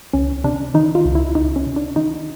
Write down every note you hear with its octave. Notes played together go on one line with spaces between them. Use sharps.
C#2 C#4
C3 D4
D#3 D#4
F4
C#2
E4
C#2 D#4
C#4
C3
D4
D#3 D#4